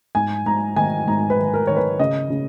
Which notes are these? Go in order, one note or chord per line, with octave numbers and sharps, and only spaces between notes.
G#2 G#5
G#2 A#5
D#3 G#5
G#2 A#5
B4
D#3
A#4
D#3 C#5
B4
C#3 D#5
C#3